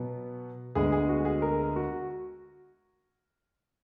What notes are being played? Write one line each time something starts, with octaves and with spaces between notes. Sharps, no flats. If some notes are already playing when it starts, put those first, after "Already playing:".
Already playing: B2 F#3 B3
D2 D3 G#3 B3 G#4
G#4
F#4
G#4
A#4
F#4